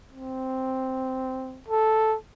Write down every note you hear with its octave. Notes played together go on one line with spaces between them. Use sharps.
C4
A4